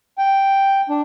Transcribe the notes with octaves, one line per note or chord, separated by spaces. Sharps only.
G5
D4